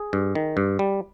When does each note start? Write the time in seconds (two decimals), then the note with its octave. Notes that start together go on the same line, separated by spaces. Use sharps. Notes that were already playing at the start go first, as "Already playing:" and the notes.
Already playing: G#4
0.13 G2
0.35 D#3
0.57 G2
0.79 G3